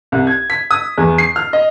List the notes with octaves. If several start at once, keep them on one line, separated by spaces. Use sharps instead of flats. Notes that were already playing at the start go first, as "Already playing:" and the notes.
C2
G#6
B6
D#6
E2
C7
F6
D#5